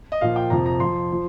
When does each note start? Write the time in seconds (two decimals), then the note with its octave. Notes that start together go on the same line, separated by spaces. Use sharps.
0.12 D#5
0.21 A#2 F3 F5
0.36 G5
0.50 F2 C3 F3 A#5
0.66 A#5
0.80 F2 F3 C6
1.12 F3